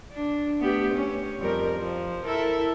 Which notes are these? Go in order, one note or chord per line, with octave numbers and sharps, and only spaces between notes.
D4
A3 B3 G4
C#4
F2 G3 A#4
F3
E4 A4 A#4